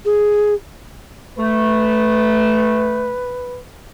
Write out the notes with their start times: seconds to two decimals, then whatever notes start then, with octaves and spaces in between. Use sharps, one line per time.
0.05 G#4
1.38 A3 B4